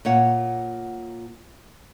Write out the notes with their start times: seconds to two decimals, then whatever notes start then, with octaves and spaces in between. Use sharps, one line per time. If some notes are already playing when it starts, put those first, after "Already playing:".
0.05 A#2 C#5 F#5